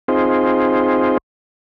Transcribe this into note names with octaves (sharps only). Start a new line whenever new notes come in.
C4 D#4 F4 G#4 C5